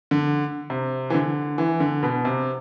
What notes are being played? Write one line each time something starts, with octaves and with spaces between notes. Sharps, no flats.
D3
C3
E3
D3
E3
D3
B2
C3